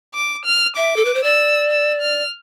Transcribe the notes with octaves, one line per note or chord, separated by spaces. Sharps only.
D6
F6
E5 D6
A4
B4
C5
D5 E6
E6
F6